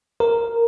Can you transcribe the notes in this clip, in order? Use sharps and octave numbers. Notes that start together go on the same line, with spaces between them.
A#4